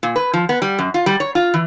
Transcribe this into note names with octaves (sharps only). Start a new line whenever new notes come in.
A#2
B4
F3
B3
G3
F#2
F4
G3
C#5
F4
E3